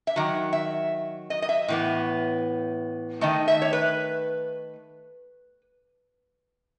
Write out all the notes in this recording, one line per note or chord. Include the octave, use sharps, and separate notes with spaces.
E5
D#3 F#3
E5
D#5
D#5
E5
A2 E3 B3
D#3 A3 D#5
E5
C#5
B4